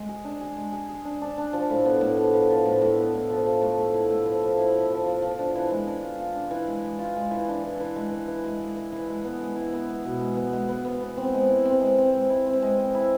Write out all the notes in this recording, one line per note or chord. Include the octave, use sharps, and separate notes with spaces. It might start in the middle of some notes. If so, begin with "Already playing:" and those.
Already playing: G#3
G#4
D4
G#4
G#3
G#4
G#4
D4
D4
D4
F3
A2
B3
A2
F3
F3
F3
A2
A2
B3
A2
F3
F3
A3
A3
E4
A3
F3
F3
E4
F3
F3
F3
F3
D4
E3
G#3
D4
F4
F4
D4
E3
G#3
G#3
F4
G#3
E3
D4
E3
E3
G#3
E3
E3
G#3
G#3
E3
E3
G#3
B3
G#3
E4
B3
B3
B2
G#3
B3
G#3
B3
B3
B3
C4
G#3
E4
C4
G#3
C4
G#3
E4
C4
G#3
C4
E4